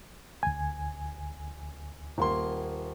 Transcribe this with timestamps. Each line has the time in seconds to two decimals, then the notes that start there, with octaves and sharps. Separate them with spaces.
0.43 D2 G#5
2.18 D#1 A#3 C6